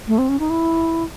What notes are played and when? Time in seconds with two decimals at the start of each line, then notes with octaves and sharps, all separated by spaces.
0.08 A3
0.18 C4
0.29 C#4
0.39 D#4
0.50 E4